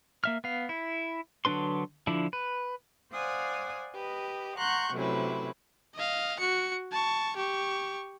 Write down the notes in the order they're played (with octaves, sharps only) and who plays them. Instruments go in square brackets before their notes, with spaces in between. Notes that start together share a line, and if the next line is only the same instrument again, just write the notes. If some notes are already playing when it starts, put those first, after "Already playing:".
[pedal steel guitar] A#3 E5 F6
B3 F5
E4
D3 F#3 D4 B4 C6
D3 F3 D4 E4
B4
[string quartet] C5 D5 F5 F#5 G#5 D#6
G4 B4 D#5
F#5 A#5 C6 C#6 F#6 G6
C3 F#3 A3 C#4 E4 B4
[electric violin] D#5 F5
F#4 C#7
A5 C#6
G4 C#6